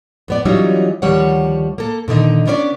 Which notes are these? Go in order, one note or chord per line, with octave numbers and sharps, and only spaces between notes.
F2 B3 D5
E3 F#3 G3 C#4 D#4 F4
D2 D#3 F3 G3 C#5 F#5
A#3 A4
A#2 D3 D#3 D#4
C#3 B3 C#4 D4 C5 D5